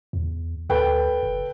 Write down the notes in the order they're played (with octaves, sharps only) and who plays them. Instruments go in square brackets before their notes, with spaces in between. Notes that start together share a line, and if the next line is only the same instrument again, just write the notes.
[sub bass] E2
[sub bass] D2 [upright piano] A4 B4 G5
[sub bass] F#1